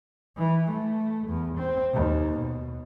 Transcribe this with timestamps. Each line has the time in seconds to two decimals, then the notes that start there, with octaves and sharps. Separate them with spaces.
0.37 E3
0.71 A3
1.28 E2
1.58 C4
1.93 D#2
2.40 B2